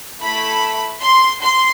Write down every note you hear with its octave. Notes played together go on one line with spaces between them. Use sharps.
A3 E4 A4 B5
C6
C6